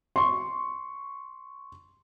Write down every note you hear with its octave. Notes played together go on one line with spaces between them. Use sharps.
C6 C#6